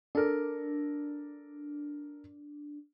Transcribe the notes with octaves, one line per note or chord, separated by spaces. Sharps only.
D4 A4 A#4